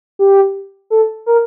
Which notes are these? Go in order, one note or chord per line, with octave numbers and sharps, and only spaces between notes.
G4
A4
A#4